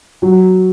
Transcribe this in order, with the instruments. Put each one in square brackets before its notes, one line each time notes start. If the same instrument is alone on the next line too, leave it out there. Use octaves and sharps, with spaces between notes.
[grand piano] F#3